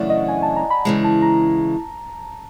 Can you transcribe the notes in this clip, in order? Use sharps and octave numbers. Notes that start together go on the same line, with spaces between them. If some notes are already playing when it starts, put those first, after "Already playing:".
Already playing: F#2 C#3 E3 A3 D4 D5 F#5
D#5
G#5
A5
A#5
B5
C#3 E3 G#3
A5
A#5